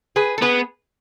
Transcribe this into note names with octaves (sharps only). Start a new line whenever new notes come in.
G#4 B4
A4
B3 G#4 B4